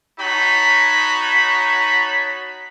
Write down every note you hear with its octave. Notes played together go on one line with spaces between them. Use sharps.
D#4 F#4 C#5 A5 B5